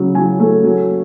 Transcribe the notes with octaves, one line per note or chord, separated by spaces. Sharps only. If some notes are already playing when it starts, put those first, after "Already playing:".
Already playing: C#3 F#3
F#3 G#5
A3
F#3